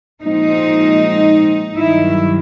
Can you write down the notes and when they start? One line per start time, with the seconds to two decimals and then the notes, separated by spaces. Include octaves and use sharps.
0.22 A#2 F3 G#3 C4 D#4
1.76 G2 D#3 F#3 E4